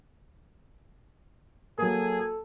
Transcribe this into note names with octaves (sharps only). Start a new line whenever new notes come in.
F#3 A#3 G#4 A4